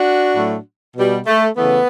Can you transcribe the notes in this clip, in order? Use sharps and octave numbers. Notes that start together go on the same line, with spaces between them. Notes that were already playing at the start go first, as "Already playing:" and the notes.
Already playing: D4 F#4
A2 F#3 A3
B2 G3
A3
C#3 E3 A3 B3